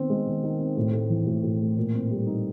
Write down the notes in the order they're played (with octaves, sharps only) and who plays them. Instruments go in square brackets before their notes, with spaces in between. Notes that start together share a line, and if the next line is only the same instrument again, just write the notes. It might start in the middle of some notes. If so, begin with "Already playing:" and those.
Already playing: [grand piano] D#3 B3 C4
G#3
D#3
D#3
C4
A2
A3
E3
A2
A2
A3
A#2
C4
G3
D#4